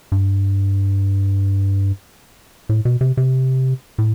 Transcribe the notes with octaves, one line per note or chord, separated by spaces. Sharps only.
G2
A2
B2
C3
C3
A2